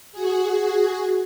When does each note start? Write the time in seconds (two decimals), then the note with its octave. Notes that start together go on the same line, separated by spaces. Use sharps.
0.12 F#4 G#4